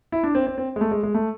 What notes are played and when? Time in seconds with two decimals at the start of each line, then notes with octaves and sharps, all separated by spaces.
0.12 E4
0.24 D4
0.35 C4
0.47 C4
0.58 C4
0.76 G#3
0.81 A3
0.91 G#3
1.03 G#3
1.14 A3